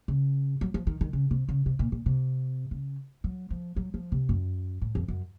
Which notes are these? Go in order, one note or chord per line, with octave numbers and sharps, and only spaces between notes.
C#3
F#3
F3
D#3
D#3
C#3
C3
C#3
C3
A#2
A#2
C3
C#3
F#3
F3
F#3
F3
C3
F#2
A2
F2
F#2